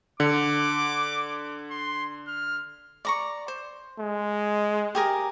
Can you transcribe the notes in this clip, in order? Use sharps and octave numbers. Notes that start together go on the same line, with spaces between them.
D3 D6
C6
F6
D5 A#5 C#6
C5
G#3
G4 G#4 A#4